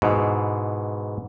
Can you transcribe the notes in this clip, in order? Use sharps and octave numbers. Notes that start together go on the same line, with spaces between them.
G#2 B2 E3